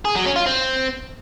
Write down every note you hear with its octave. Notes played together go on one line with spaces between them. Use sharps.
G#4
F#3
C#4
F4
C4